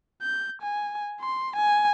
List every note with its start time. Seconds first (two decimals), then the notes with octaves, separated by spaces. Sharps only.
0.22 G6
0.62 G#5
1.21 C6
1.56 G#5